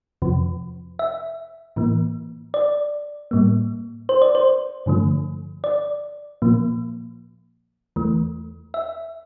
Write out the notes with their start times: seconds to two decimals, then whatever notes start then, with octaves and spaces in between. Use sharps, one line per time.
0.22 F2 C3 F3
0.99 E5
1.76 A2 E3 A#3
2.54 D5
3.31 A2 G3 A#3
4.09 C5
4.22 D5
4.35 C5
4.86 G2 D3 F3 A3
5.64 D5
6.42 A#2 F3 A#3
7.96 E2 E3 A3
8.74 E5